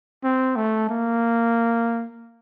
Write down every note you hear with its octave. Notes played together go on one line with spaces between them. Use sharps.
C4
A3
A#3